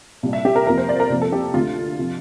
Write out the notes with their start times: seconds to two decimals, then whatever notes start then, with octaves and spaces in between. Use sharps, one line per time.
0.23 C2 A#2 G3
0.33 E5
0.45 G4
0.56 A#4
0.66 F2 C3 F3 A#3 A#4
0.78 C5
0.89 D5
1.00 A#4
1.10 C2 C3 F3 A#3
1.21 A4
1.32 G4
1.54 D2 D3 A3 F4
1.98 C3 F3